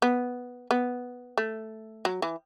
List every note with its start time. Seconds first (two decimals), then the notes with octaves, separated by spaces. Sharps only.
0.02 B3
0.71 B3
1.38 A3
2.05 F#3
2.22 E3